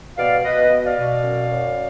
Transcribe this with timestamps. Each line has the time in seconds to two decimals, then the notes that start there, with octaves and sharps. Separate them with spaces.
0.17 B2 D5 F5
0.44 B2 B4 D#5
0.70 B2
0.78 D#5
0.84 D5 F5
0.97 B2
1.23 F#2
1.51 F#2